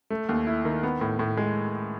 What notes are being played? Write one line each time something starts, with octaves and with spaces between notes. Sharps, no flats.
A3
D#2
E4
D#3
B3
A2
A2
G#3